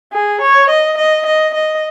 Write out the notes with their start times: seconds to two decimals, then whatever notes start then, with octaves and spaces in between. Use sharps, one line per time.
0.13 G#4
0.41 C#5
0.70 D#5
0.98 D#5
1.26 D#5
1.54 D#5